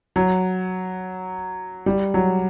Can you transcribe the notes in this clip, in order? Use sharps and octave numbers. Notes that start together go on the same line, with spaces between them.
F#3
G3
F#3